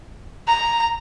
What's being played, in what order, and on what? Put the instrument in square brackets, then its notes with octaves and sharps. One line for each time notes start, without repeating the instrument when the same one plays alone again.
[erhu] A#5